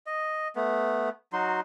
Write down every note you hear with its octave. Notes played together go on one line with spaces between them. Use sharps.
D#5
A3 B3
F#3 D#4 F#4 C6